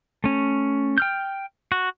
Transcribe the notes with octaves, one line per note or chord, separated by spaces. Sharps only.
A3 C#4
G5 F6 G6
F#4